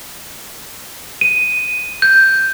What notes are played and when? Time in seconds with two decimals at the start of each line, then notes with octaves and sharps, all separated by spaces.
1.21 D#7
2.02 G6